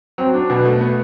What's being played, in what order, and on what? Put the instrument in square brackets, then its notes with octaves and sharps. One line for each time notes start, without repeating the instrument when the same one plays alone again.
[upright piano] F#3 [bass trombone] C4
[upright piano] D4
[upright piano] B2 [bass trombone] B3
[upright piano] A3
B3